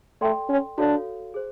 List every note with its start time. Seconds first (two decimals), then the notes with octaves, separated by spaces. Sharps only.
0.21 A3 A4 D5 G5 C6
0.49 C#4
0.78 D4 F#4 A4 C#5 F5
1.34 G#4 C5